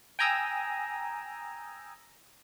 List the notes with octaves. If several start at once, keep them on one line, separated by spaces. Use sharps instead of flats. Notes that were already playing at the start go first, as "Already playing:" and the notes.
G5 G#5 A#5 D#6 E6